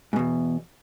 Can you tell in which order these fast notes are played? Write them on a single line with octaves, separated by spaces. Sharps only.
G#2 B2 E2